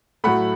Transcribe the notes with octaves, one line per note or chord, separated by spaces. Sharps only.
A2 F#3 A3 F#5 B5